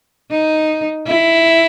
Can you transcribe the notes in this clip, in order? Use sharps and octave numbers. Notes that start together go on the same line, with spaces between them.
D#4
E4